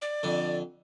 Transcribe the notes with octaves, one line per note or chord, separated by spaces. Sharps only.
D5
F2 D3